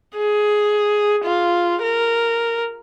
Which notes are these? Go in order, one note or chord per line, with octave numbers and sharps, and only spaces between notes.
G#4
F4
A#4